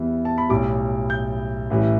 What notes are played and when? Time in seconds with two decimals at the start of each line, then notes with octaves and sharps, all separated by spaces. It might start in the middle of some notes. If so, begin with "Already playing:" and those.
Already playing: E2 E3 G3
0.25 A5
0.38 B5
0.50 B1 A2 G3 D6
1.10 G6
1.70 A1 A2 E3 G3